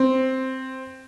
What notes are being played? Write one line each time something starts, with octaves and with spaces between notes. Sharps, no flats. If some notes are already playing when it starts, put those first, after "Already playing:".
Already playing: C4